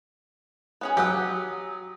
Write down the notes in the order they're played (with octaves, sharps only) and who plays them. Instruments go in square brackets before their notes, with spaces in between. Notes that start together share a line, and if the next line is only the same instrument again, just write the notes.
[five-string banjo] B3 C#4 G#4
[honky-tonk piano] F#3 D#6 [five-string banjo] G4 F#5